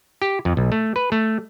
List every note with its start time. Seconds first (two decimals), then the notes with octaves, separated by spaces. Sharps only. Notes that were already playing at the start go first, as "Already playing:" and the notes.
0.22 G4
0.45 F2
0.57 B1
0.72 A3
0.96 B4
1.12 A3